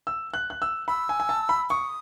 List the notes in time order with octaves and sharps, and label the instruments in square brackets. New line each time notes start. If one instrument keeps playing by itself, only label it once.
[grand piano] E6
F#6
F#6
E6
[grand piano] B5 [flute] E6
[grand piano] G#5
G#5
A5
B5
[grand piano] C#6 [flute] D#6